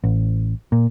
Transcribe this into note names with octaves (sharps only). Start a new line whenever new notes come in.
A1
A#2